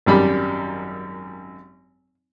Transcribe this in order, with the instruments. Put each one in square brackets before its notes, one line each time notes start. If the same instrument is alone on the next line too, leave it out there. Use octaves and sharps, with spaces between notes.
[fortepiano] G#1 F#2 G3 B5